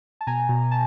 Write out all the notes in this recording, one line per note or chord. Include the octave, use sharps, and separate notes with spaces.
A5
B2 G#5 A#5
B2
A5